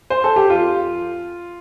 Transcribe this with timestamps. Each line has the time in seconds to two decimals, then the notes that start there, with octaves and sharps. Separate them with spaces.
0.10 C5
0.24 A4
0.36 G4
0.50 F2 F4